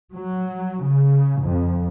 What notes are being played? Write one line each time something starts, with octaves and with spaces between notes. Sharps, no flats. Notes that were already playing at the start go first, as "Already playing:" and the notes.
F#3
C#3
F2